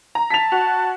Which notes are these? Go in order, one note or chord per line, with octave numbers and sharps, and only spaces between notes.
A#5
A5 B6 F7
F#4